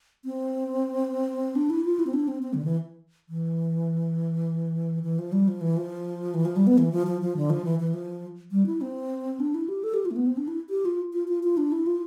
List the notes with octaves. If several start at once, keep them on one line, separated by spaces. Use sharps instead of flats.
C4
D4
E4
F4
E4
C4
D4
C4
C4
D3
E3
E3
E3
F3
G3
F3
E3
F3
E3
F3
G3
B3
E3
F3
F3
F3
D3
F3
E3
E3
F3
G3
E4
C4
D4
E4
G4
A4
G4
F4
A3
B3
C4
D4
E4
G4
F4
F4
F4
F4
D4
E4
F4